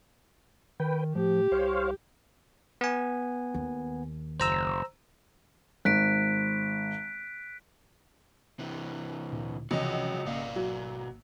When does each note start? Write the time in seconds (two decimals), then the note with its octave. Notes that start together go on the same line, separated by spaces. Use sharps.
0.80 D#3 B4 G5
1.15 A2 F3 G4
1.52 C2 C5 C#5 F5
2.81 B3 G#5
3.54 D#2
4.40 F#1 C5 A#5 E6
5.85 G#1 F#6 B6 D7
8.59 C3 E3
9.32 D2 A#2
9.71 C#2 C3 E3 F3 F#4 C#5 D#5 G5
10.25 G#1 B2 A#3 D5 F5
10.56 F#3